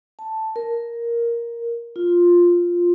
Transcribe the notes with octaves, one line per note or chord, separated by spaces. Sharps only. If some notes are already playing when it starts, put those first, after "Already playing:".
A5
A#4
F4